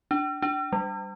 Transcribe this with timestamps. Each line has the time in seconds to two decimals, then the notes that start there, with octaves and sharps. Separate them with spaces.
0.11 D4
0.42 D4
0.73 G3